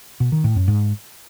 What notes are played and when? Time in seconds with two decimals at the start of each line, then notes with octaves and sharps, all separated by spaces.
0.20 B2
0.32 D#3
0.44 A2
0.56 F#2
0.68 G#2